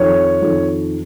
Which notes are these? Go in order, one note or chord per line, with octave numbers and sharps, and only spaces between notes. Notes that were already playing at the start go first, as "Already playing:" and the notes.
Already playing: F2 D#3 C#5
F2 D#3